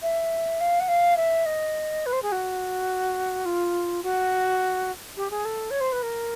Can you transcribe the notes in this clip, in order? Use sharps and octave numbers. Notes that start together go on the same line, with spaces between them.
E5
F5
F#5
F5
E5
D#5
B4
C5
G#4
F#4
F4
F#4
G4
G#4
A4
C#5
C5
B4
A#4